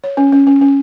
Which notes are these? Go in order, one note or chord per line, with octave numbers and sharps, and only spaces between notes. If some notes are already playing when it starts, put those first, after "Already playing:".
C#5
C#4
C#4
C#4
C#4